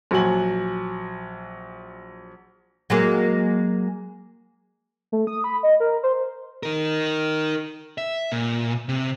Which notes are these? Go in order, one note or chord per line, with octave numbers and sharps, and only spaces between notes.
A#1 F#3 F#4 G#5 F#7
F#3 G#3 A#3
A3
D#6
B5
D#5
A#4
C5
D#4 A#4
E5
A#2
C3